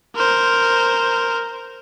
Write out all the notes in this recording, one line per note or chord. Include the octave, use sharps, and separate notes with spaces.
A#4 C5